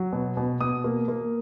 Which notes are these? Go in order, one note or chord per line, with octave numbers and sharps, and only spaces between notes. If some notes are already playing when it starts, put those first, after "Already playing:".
Already playing: F#3
B2
B2
B2 D#6
A#3
A#3